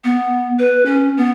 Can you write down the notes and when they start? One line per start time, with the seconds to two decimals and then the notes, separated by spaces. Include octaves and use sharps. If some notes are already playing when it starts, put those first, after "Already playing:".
0.04 B3
0.59 B4
0.86 C#4
1.17 B3